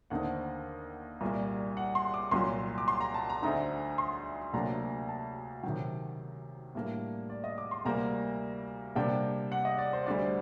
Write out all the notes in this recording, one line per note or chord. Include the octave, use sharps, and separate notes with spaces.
D#2 D3 A3 C4 D#4 F#5
C2 A#2 G3 A#3
F#5
C6
D6
C2 A#2 F#3 C6
D6
C6
A#5
A5
A#5
D2 D3 A3 C4 D#4 A#5
C6
D2 C3 F#3 A#3 D4 A#5
A5
C3 D#3 F#3 G5
A2 G3 A#3 D4
D5
D#5
D6
C6
D2 C3 G3 A#3 A#5
C3 G3 A#3 D4 G5
F#5
D#5
D5
C5
D2 D3 G3 C4 D5